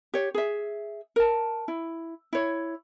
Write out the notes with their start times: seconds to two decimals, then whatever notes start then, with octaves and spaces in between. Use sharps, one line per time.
0.14 G4 C#5
0.34 G#4 E5
1.16 A#4 A5
1.68 E4
2.33 E4 C#5